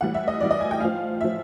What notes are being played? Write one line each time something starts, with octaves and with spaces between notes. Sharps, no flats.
A2 E3 G3 F#5
E5
D#5
A2 E3 G3 D5
D#5
G#5
G5
A2 F3 F5
A2 F3 E5